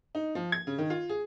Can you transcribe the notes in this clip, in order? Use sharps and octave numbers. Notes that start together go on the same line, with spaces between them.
D#4
F3
G#6
C#3
D#3
F4
G#4